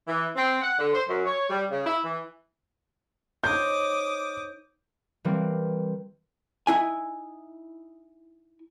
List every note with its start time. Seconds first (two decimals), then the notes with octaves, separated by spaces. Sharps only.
0.07 E3
0.36 C4
0.61 F#5
0.78 D3
0.93 C5
1.08 F#2
1.25 C#5
1.50 G3
1.71 C#3
1.85 E4
2.04 E3
3.44 D#4 C5 C#5 D6 D#6 G6
5.24 E3 G3 A#3 C4
6.67 D#4 E4 G#5